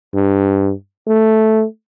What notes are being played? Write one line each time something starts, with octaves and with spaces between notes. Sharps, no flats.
G2
A3